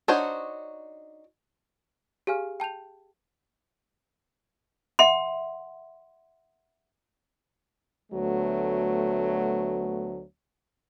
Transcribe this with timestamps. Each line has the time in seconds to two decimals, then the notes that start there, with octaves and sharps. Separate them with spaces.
0.08 D4 D#4 F#4 C5 C#5
2.27 G4 G#4 F5 G#5 F6
2.60 G5 A5 G6 F7
4.99 E5 F#5 C6
8.13 D2 F#3 A3 B3